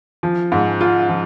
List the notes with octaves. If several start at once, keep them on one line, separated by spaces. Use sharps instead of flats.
F3
G#2
F4
F3